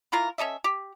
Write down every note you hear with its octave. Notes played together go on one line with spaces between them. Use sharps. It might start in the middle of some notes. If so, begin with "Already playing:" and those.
E3 E4 F4 A#4
C#4 A4 D#5 E5
G4